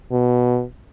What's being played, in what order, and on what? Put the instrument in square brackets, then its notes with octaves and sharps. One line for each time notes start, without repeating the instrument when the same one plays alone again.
[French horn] B2